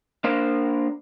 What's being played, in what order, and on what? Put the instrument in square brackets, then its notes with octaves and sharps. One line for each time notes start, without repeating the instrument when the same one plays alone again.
[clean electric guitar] A#3 D4 A#4 C5 F5